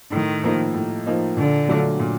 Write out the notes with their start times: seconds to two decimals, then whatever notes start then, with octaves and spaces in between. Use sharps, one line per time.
0.12 A2 D#3
0.43 F3 A#3 D#4
0.74 A2
1.06 F3 A#3 D#4
1.37 A#2 D3
1.68 F#3 A3 D4 F4
1.99 A#2